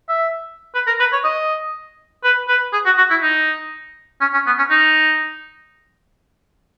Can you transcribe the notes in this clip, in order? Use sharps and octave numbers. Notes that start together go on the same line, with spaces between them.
E5
B4
A#4
B4
C#5
D#5
B4
B4
G#4
F#4
F#4
E4
D#4
C#4
C#4
B3
C#4
D#4